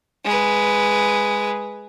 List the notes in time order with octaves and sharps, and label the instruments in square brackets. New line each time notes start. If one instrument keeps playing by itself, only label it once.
[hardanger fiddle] G#3 B4